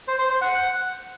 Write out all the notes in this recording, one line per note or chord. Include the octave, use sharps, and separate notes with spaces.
C5
C5
C5
F#5